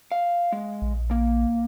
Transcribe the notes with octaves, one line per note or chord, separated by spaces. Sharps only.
F5
G#3
A#1
A#3